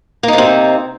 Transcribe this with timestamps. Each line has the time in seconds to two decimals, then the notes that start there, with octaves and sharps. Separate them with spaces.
0.23 A#3
0.28 D#4
0.33 C3
0.38 C4